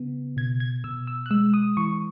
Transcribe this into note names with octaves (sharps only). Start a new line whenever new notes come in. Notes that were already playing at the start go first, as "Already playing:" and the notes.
Already playing: C#3 B3
B2 G#6
G#6
B2 E6
E6
F#6
G#3 E6
D#6
E3 C#6